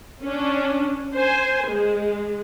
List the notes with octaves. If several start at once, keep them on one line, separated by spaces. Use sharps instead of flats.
C#4 D4
C5 G#5
G#3